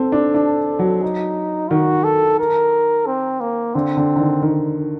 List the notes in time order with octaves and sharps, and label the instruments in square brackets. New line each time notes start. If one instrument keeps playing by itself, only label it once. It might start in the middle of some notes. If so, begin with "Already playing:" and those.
Already playing: [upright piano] C4 [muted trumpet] A4
[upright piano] D4
D4
F#3
[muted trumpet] D#4
[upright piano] D#3 [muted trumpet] F#4
[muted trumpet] A4
A#4
C4
A#3
[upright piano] D3 [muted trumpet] C4
[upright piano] D3
D3
D#3
D#3